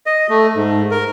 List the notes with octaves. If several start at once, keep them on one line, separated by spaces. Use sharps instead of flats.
D#5
A3
G#2
A#4